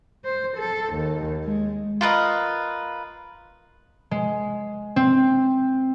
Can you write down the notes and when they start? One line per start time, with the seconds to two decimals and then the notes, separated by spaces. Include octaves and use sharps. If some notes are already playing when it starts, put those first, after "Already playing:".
0.25 C5
0.57 A4
0.93 D#2
1.43 G#3
2.01 F4 A#4 B4 D#5
4.11 G#3
4.96 C4